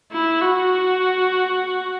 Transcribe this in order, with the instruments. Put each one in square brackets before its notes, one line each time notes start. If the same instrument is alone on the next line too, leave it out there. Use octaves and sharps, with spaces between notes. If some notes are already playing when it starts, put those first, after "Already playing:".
[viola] E4
F#4